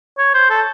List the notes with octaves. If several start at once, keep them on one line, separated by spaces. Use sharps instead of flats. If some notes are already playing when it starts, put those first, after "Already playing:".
C#5
C5
A4